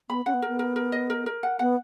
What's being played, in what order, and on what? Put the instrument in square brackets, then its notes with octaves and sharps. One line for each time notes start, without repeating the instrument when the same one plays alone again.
[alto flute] B3 [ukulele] B5
[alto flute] C#4 [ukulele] F#5
[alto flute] B3
[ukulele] A#4
[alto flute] B3
[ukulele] A#4
A#4
D#5
A#4
A#4
F#5
[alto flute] B3 [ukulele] F#5